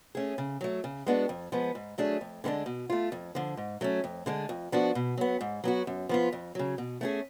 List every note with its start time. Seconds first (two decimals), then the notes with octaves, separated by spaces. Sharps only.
0.15 A3 C#4 G#4
0.38 C#3
0.61 F#3 A3
0.84 C#3
1.06 G#3 B3 D4 F#4
1.29 F2
1.52 F3 G#3 B3
1.75 G#2
1.98 F#3 A3 D4 G#4
2.21 F2
2.44 D3 G#3 B3 D4
2.66 B2
2.90 A3 F4
3.12 F2
3.35 D3 F3
3.57 G#2
3.81 F#3 A3 C#4
4.04 F2
4.26 D3 G#3 D4
4.49 F2
4.72 F3 B3 D4 F#4
4.95 B2
5.17 F#3 B3
5.41 G#2
5.64 F#3 B3 F#4
5.87 F#2
6.09 F3 B3 F4
6.33 F2
6.55 C#3 F#3
6.78 B2
7.01 A3 C#4 F4 G#4